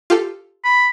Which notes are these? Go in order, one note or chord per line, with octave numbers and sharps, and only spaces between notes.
F4 G4 A4
B5